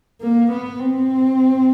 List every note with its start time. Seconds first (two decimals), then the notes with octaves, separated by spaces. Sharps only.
0.22 A#3
0.52 B3
0.80 C4